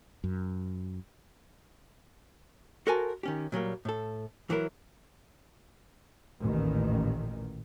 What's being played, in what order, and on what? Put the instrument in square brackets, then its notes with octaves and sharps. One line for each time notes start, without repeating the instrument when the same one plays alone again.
[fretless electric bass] F#2
[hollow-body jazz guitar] F#4 A4 A#4 C5 G#5 A5
D#3 C#4 G4
A#2 F#3 G3 A#3
A2 A4
E3 F#3 E4 A#4
[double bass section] A1 D#2 A#2 D#3